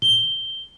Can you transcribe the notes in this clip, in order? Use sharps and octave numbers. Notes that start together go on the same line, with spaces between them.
G7